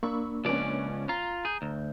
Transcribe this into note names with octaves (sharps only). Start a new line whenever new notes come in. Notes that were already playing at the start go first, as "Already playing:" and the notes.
A#3 D4 B5 C#6 E6
C#2 F3 B3 C#4 D5
F4 A#5
G#4 G6
D2